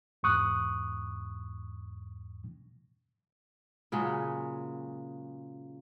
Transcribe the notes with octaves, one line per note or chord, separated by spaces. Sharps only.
E2 G#2 C#6 D#6 F#6
A#2 C#3 F#3 G#3